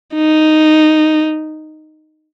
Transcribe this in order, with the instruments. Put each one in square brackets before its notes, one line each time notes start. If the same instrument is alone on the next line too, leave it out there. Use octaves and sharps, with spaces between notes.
[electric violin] D#4